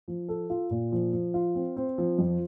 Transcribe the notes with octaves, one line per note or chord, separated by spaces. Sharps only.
F3
A4
F4
A#2
F3
F3
F4
C4
C4
F3
F2